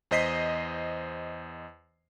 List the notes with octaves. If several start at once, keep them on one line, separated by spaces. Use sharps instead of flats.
E2 C5 D#5 B6 C7